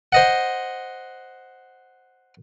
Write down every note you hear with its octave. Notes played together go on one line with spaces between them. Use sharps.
C5 D#5 F#5